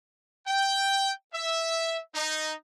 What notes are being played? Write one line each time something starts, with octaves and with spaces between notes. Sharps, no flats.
G5
E5
D#4